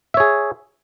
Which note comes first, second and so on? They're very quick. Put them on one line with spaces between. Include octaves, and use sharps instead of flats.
E5 C#5 G#4